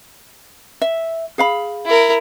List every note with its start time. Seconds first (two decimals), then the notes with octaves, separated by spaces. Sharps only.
0.82 E5
1.38 G#4 F5 B5
1.86 E4 A#4